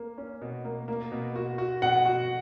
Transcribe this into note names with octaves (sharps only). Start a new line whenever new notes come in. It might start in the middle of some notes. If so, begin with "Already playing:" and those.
Already playing: A#3
C#4
B2
A#3
A#3
B2
F#4
F#4
B2 F#5
F#4